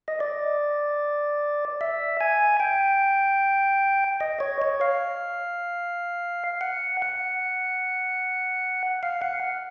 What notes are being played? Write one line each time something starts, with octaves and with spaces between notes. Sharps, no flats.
D#5
D5
E5
G#5
G5
D#5
C#5
C#5
F5
F#5
F#5
F5
F#5